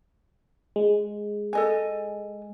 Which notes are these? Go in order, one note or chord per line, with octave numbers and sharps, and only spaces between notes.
G#3
A4 D#5 G#5